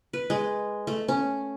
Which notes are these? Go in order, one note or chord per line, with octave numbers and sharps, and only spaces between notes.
B4
G#3
A3
C#4